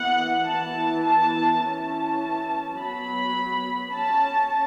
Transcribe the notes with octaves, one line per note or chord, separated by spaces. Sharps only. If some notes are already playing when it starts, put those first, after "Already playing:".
Already playing: E3 B3 F#5
E3 B3 A5
A5
E3 C#4 A5
F#3 B3 B5
C#4 A5